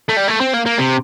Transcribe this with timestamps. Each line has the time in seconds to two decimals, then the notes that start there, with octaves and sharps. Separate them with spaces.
0.09 A3
0.17 G3
0.28 A3
0.41 C4
0.54 A#3
0.66 A#3
0.79 C3